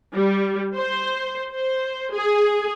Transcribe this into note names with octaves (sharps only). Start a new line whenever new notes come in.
G3
C5
C5
G#4